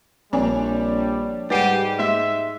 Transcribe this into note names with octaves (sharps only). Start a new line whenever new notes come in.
A#1 G3 C4 D4 C#5 G#5
G#2 G3 G4 B4 F#5 G#5 C7 D#7
G#3 E5